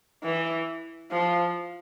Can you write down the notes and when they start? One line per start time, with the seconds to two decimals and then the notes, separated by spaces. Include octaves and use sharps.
0.23 E3
1.12 F3